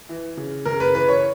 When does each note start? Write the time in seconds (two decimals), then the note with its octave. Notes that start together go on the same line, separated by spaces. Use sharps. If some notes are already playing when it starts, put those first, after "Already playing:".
0.09 E3
0.37 C#3
0.65 C#3 A#4
0.80 B4
0.94 E3 B4
1.08 C#5